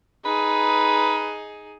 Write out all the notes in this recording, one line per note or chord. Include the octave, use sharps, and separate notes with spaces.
D#4 G#4 B4